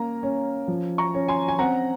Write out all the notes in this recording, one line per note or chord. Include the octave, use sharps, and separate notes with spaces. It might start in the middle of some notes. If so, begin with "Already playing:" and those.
Already playing: A#3 C#4 A#5
C#4
F3
A#5 C#6
C#4
G#5 C6
G#5
C4 F#5 A#5